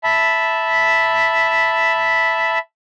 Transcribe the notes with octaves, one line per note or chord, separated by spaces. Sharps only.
E5 A5 B5